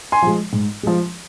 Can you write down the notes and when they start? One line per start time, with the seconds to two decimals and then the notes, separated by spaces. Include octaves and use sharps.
0.12 G#5 C6
0.22 F3 G#3
0.53 G#2
0.83 F3 G#3